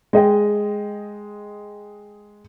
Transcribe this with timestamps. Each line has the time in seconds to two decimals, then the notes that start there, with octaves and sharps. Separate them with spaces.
0.13 G#3 D#5 G5